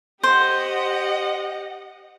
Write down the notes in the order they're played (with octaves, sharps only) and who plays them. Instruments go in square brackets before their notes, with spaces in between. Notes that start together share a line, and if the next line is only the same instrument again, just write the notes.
[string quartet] G4 D#5 F#5 [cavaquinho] C5